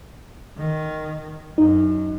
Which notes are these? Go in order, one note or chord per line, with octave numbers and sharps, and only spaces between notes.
D#3
F#2 D#4